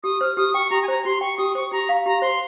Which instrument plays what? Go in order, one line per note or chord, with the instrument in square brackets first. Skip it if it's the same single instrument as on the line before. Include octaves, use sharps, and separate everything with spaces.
[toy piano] G4 [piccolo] D#6
[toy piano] C5 [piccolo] F6
[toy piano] G4 [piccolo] D#6
[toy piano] G5 [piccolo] C#6
[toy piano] G4 [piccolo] A#5
[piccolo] G#5
[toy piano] C5 [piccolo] A#5
[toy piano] G4 [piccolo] C6
[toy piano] G5 [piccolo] C#6
[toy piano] G4 [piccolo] D#6
[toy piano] C5 [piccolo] C#6
[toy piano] G4 [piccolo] A#5
[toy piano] F5
[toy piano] G4 [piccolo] A#5
[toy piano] C5 [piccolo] C6